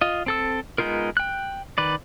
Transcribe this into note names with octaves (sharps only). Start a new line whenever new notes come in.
F4 D#5
C4 A4 E6
G#3 B3 D#4 F4 A#4
G5 F#6
D#3 B4 D5